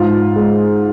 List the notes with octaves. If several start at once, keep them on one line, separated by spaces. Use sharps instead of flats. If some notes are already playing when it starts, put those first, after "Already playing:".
Already playing: G#2 F4
G#3